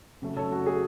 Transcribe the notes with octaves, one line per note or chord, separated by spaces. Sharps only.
C#3 F#3 A3
A4 C#5
F#4
G#4